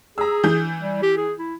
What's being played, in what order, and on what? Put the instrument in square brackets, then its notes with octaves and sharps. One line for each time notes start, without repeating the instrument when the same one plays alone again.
[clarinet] G#4 [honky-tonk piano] A#5 E6
[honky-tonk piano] E3 G6
[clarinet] G3
G4
G#4
E4